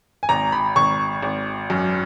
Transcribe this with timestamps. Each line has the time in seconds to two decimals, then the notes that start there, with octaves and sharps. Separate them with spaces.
0.23 G#5
0.29 G#1 A#5
0.52 B5
0.76 G#1 C#6
1.23 G#1
1.70 F#2